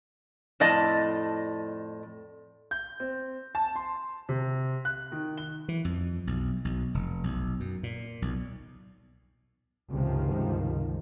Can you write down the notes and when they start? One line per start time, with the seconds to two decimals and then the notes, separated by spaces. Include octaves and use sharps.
0.60 F2 A2 D5 D#5 A5
2.71 G6
3.00 C4
3.55 A5
3.76 C6
4.29 C3
4.85 F#6
5.12 D#3
5.37 G7
5.69 E3
5.85 F2
6.27 B1
6.65 B1
6.94 F1
7.24 B1
7.60 F#2
7.83 A#2
8.22 B1
9.90 C#2 G2 C3 D#3 F3